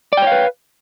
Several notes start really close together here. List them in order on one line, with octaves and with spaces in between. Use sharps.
D5 G5 C#5 F5 B4